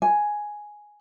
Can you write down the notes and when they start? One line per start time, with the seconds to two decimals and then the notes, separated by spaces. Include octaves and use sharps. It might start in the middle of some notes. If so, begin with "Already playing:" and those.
0.02 G#5